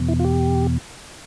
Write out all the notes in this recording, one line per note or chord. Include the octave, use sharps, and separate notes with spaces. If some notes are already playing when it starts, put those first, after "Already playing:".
Already playing: E2 B2
E4
F4
G4